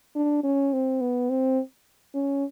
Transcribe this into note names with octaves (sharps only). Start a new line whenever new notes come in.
D4
C#4
C4
B3
C4
C#4